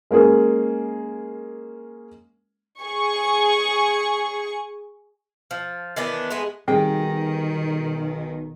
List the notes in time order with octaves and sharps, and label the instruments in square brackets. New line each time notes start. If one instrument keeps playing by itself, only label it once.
[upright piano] G#3 A#3 C#4 G#4
[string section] G#4 C#6
[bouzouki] F3
D#3 E3 B3 D4
G#3 A3 B3 G#4
[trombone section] B1 [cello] D#3 [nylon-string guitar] G3 G#4 G5 [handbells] C4 C7